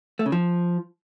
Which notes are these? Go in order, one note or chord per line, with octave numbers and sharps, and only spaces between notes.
A3
C#3
F3